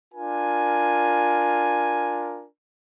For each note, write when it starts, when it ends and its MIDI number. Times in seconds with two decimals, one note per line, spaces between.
0.14 2.46 62
0.14 2.46 65
0.14 2.46 70
0.14 2.46 80